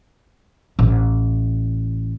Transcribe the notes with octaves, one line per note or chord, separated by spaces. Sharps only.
A1